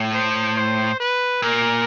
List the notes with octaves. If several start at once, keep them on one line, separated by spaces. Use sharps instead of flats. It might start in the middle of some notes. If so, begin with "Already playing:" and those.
Already playing: A2
C5
C5
B4
A#2 A#4